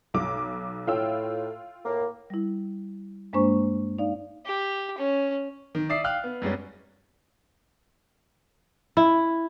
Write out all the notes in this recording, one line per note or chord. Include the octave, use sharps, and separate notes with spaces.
B1 D6
A2 F4 G5 E6
A2 A#3
G3 E4
G2 G#3 A#3 D4 C5 C#6
D#4 D5 F5
G4
C#4
D#3
D5 E5 D#6 C7
F5 G5 F6 F#6
B3
F#2 G3 G#3 B3 C#4
E4